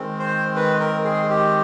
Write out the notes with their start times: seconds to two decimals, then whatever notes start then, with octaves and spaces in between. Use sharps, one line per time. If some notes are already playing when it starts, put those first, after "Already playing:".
Already playing: D#3 G#3 C4
0.19 C5
0.56 B4
0.80 A#4
1.04 G#4
1.30 G4